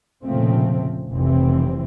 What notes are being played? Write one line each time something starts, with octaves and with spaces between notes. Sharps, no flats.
F1 A#2 C#3 F3 A3 C4
F1 B1 C3 E3 C4